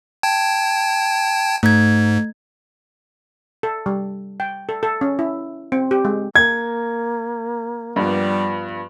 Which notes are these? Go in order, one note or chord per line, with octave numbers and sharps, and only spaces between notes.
G5 A5 G#6
G#2 A3 G#6
A4
G3
G5
A4
A4
C#4
E4
C4
G4
G#3
A#3 G#6
G2 F3 G3 B3